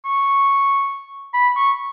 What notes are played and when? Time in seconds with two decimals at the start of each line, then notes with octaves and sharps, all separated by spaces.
0.05 C#6
1.34 B5
1.56 C#6